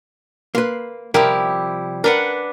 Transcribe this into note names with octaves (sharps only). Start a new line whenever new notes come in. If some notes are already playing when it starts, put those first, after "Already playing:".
A#3 B4 C6
C3 F3 G3 E4 G4 A#4
D4 A#4 B4 F#5